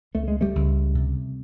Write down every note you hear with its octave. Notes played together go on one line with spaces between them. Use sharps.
C#2 A3
G#3
G3 A3
C#2
C3